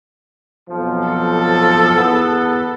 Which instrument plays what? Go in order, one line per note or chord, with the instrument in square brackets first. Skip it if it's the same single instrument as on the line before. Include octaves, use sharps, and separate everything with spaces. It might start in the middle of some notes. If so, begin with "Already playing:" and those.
[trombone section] B1 F2 F3
[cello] A4
[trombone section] E2 B3